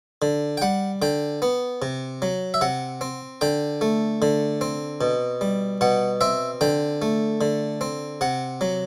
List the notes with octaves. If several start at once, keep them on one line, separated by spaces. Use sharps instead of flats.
D3
G5
G3 F#5
D3 G5
B3
C3
F#3
E5
C3 F#5
C4
D3 G5
A3
D3
C4
B2
G3
B2 F#5
C4 E5
D3 G5
A3
D3
C4
C3 F#5
F#3